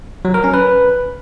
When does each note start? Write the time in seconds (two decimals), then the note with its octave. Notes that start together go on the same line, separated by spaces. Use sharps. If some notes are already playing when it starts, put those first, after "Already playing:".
0.25 F#3
0.34 A#4
0.44 C#4
0.54 B4